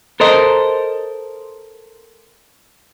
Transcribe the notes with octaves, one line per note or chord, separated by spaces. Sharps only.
A4 A#4 C5 D#5